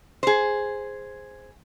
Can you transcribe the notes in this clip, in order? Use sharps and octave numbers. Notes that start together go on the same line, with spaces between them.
G#4 C5